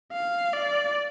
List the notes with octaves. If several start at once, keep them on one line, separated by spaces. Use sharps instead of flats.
F5
D5